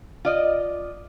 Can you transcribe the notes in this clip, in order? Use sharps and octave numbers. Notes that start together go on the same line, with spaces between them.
F4 D5 D#5